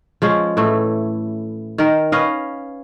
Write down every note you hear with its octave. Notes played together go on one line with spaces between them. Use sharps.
F3 G#3 C#4
A2 E3 A3
D#3 A#4
C#4 B4 D#5 F5